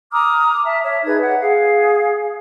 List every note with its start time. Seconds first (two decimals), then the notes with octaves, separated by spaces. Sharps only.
0.12 A#5 D6 D#6 F6
0.64 E5 A5
0.82 C#5 E5
1.04 D#4 G#4 B4 G#6
1.21 C#5 F#5
1.39 G#4 F5